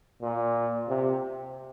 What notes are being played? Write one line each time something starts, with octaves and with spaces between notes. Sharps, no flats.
A#2
C3